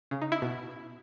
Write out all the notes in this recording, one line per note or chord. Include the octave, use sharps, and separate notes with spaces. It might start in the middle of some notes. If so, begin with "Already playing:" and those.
C#3
D#4
E4
B2